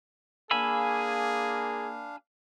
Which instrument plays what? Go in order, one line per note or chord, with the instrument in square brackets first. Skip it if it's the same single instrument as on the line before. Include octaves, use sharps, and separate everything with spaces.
[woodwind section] A#3 [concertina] D4 F5 [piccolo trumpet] G#4 [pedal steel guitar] G#5 B5 E6